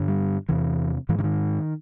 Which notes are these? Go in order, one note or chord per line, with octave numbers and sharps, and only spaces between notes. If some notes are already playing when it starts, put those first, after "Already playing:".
Already playing: G2 D3
G3
E2 C3 E3
G#2 E3
D3
D#3